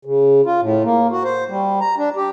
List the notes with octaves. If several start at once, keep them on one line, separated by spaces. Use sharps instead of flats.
C#3
F4
A2
A#3
F#4
C5
G3
A#5
D4
G4